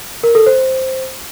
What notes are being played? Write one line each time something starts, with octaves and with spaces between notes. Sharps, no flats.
A#4
A4
C5